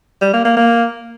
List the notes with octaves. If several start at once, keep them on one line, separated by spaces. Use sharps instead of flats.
G3
A#3
A#3
A#3